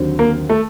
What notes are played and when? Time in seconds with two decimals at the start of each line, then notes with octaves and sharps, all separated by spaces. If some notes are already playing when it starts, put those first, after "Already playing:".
Already playing: D#2 D3 F#3 C4
0.19 A#3
0.50 A3